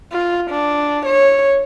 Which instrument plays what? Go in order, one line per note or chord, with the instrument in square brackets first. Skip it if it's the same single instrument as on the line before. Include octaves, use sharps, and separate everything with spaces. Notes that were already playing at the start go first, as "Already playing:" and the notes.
[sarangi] F4
D4
C#5